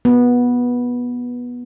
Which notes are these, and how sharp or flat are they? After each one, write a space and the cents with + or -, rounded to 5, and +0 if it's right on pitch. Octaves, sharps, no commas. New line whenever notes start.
B3 -15